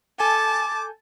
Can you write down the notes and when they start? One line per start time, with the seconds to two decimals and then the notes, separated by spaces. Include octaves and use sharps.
0.19 A4 G#5 A5 D6 G6